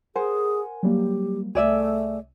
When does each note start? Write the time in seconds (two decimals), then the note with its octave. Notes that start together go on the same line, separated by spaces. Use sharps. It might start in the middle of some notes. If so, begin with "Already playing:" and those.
0.16 G#4 A#4 C5 F#5 G#5
0.83 F#3 G3 A#3 G4
1.55 C2 A3 G#4 D5 E5